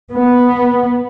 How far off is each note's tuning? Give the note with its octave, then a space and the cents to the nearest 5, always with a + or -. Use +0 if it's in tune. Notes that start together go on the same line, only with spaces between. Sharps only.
B3 -5